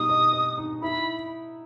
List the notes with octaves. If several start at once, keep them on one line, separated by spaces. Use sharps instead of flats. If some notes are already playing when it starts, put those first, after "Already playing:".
Already playing: B2 G3 D#4 D#6
D#5
D#5
D#4
E4 B5